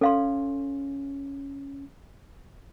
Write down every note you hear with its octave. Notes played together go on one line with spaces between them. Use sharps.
C#4 A4 F5 C6